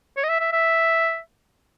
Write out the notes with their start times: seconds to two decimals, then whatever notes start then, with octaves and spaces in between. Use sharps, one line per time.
0.17 C#5
0.24 D#5
0.29 E5
0.40 E5
0.53 E5